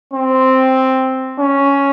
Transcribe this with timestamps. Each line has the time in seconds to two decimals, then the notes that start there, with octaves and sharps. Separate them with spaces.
0.14 C4
1.40 C#4